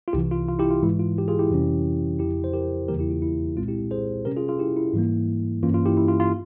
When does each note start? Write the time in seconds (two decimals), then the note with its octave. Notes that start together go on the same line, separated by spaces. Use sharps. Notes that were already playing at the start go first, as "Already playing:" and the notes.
0.08 F4
0.13 C2 C3 E3 E4 G4
0.31 F4
0.48 F4
0.59 E4 G4
0.71 F4
0.82 G#2 E3 G#3 E4
0.99 F4
1.18 G4
1.28 F4 G#4
1.39 E4 G4
1.51 F2 C3 E3 G3 C#4
2.19 F2 C#3 F3 E4 G4
2.44 C5
2.53 G4 A#4
2.88 E2 C#3 E3 G3 A#3 G4 A#4
2.99 E4 G4
3.10 F4
3.22 E4
3.57 C2 A#2 G#3 C4 F4
3.68 E4 G4
3.91 G#4 C5
4.25 C3 G3 C#4 G4 A#4
4.37 F4 G#4
4.48 F4 G#4
4.59 E4 G4
4.77 E4
4.93 G#2 E3 G3 A#3
5.63 G2 E3 A#3 C#4 F4
5.74 F4
5.86 E4 G4
5.97 E4
6.08 F4
6.20 F4